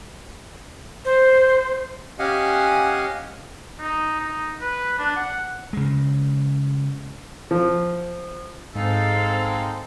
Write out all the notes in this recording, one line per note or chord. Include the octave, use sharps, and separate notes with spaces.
C5
C#4 G4 D#5 F5 F#5 G#5
D#4
D#4
B4
D4
F#5
C#3 G#3
F3
G#2 G#3 C4 D#4 A4 F5